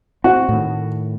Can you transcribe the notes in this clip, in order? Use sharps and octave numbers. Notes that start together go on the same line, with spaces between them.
C4 F#4
A2 D#3